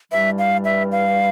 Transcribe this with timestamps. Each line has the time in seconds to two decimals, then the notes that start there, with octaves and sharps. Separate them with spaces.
0.12 G2 E3 G3 E5
0.38 F5
0.64 E5
0.92 F5